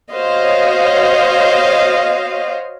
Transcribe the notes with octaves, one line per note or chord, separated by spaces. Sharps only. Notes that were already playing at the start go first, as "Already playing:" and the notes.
F#4 C5 C#5 D#5 F5